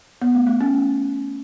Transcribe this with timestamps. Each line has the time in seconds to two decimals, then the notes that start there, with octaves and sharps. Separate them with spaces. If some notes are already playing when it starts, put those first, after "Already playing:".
0.22 B3
0.35 A3
0.47 A3
0.60 C#4